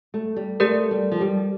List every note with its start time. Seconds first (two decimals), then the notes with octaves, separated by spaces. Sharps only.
0.14 A3
0.36 G3
0.60 A3 G4 A#4 D5
0.91 G3
1.12 F3
1.21 G3